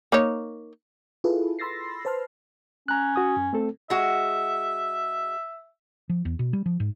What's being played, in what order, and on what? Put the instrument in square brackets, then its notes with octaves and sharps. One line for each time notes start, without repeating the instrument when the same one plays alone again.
[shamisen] A#3 D#4 C#5
[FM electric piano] E4 F4 G#4 A4 B4
B5 C6 E6 A6 A#6 C7
B4 C5 A5 C6 F6
[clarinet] C#4 [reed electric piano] A#5 F#6
[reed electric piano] F#4 D#6
F#2
A3 C4 A4
[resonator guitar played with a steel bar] G#3 F#4 [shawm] E5
[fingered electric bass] F3
E2
B2
G3
F3
G#2